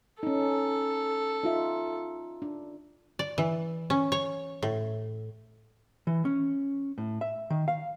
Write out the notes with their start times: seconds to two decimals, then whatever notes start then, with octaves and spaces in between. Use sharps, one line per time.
0.23 C#4 D#4 A4
1.43 D#4 F4 E5
2.42 D4
3.19 D5
3.38 E3
3.90 C#4
4.12 C#5
4.62 A2
6.07 E3
6.25 C#4
6.98 A2
7.21 E5
7.50 D#3
7.68 F5